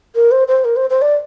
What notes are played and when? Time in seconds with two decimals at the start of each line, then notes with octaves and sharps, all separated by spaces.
0.15 A#4
0.31 C5
0.48 C5
0.65 A#4
0.76 C5
0.90 C5
1.02 D5